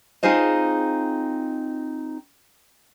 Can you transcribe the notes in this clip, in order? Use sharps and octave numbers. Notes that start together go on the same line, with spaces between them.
C4 D#4 F4 G#4 C5 D#5